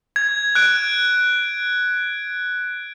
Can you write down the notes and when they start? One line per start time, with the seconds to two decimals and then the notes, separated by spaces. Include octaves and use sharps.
0.16 G#6
0.55 F#6 D7